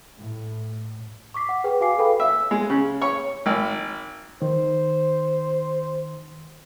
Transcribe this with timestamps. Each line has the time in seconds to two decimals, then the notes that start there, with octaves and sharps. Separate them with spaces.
0.18 A2
1.34 C#6 D6 B6 C7
1.49 F#5
1.64 G#4 B4 G5
1.81 F#4 F5 G#5 D6 C7
1.99 A4 B4 F5 G5 B5
2.20 E5
2.51 G#3
2.70 C#3
3.01 C#5
3.46 G#1
4.42 D#3 C5